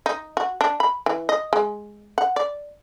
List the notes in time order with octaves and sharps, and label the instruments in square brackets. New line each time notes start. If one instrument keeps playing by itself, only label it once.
[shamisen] D#4
F#4
D4
B5
E3
D#5
G#3
F#5
D5